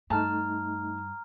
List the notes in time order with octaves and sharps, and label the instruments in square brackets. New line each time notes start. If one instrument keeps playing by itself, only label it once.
[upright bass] G2 [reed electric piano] A3 D#4 [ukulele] A5 [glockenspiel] A#5 F6